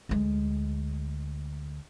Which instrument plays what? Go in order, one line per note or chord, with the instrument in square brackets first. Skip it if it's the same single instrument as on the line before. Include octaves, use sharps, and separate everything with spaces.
[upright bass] D2 G#3